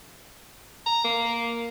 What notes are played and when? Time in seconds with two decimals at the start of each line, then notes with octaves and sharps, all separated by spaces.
0.86 A#5
1.04 A#3